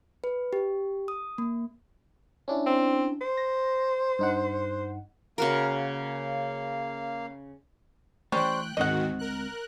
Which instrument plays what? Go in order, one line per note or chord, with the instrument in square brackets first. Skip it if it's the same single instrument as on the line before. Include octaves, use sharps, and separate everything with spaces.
[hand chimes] B4
G4
D#6
A#3
[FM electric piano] C#4 D4 E4
[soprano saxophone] C4
C5
[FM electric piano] A#6
G2 D#4 F#5
[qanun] C#3 F#4 A#4 [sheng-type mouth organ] A#3 F5
[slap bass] E3 A3 [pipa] G3 C#4 C5 [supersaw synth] G5 F#6
[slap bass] D2 G#3 C4 [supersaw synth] G#2 D#3 F#4 [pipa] D#5 F#5
[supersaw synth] A#4 F#6